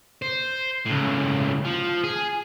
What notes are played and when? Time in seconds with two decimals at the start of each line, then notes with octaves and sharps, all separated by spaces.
0.22 C5
0.86 C#2 A2
1.65 F3
2.04 G#4